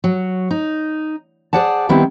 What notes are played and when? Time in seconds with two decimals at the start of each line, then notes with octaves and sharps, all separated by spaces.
0.04 F#3
0.51 D#4
1.53 G#4 C5 D5 F#5 A5
1.89 D#3 G3 B3 C4 E4